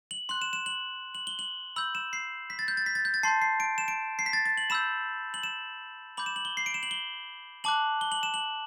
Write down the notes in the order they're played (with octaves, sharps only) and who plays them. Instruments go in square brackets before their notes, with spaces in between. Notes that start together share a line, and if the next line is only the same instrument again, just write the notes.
[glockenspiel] F#7
C6 F#6 F#7
E7
E7
F#7
F#7
G7
F#7
B5 E6 G6 F#7
E7
C7
B6
A6
G6
A6
B6
A6
G6
A6
A5 C6 G6 C7
C7
D7
E7
D7
C7
B6
A6
A6
F#7
B5 E6 G6 E7
F#7
E7
B5 D6 G6 F#7
E7
F#7
G7
C7
D7
E7
F#7
G7
A5 D6 F#6 F#7
G7
F#7
E7
F#7